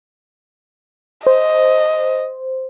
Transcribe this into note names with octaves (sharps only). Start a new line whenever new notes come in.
C5 D#5